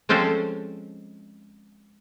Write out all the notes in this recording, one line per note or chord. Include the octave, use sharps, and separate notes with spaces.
F3 G#3 C4 C#4 A4 C5